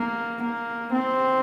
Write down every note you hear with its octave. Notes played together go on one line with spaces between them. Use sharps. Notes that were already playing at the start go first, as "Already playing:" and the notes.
Already playing: A#3
A#3
C4